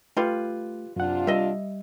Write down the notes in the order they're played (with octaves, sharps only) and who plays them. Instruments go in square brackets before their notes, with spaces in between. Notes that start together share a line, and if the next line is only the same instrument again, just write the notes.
[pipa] G3 F4 B4 [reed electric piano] A3
[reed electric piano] F#2 F#5 [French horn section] C3 D4 F4
[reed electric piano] G3 [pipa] D#5 E5